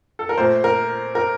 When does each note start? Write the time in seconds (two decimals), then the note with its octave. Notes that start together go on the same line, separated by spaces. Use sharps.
0.19 A4
0.29 A#4
0.38 A#2 A3 C5
0.64 A#4
1.15 A#4